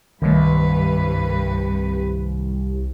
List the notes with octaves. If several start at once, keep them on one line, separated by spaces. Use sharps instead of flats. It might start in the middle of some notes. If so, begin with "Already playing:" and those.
C2 G2 D#3 F#3 A3 B4